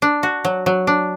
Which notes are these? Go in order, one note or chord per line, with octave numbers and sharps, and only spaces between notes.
D4
F#4
F#3
F#3
D4